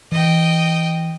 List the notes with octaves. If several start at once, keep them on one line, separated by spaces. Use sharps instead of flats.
E3 D#5 G5